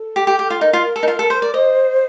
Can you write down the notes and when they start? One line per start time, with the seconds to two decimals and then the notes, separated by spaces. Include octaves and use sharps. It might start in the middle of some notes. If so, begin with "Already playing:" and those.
Already playing: A4
0.16 G4
0.27 G4
0.39 G4
0.50 F4
0.61 D#4 A#4
0.73 F4
0.96 A4
1.03 D#4
1.08 F4
1.19 A4
1.30 C5
1.42 D5
1.54 C5 D#5